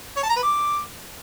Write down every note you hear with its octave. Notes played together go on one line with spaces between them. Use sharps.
C#5
A5
A#5
B4
D6